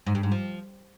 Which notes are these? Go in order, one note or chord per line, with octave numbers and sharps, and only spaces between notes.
G#2
G2
G#2
F3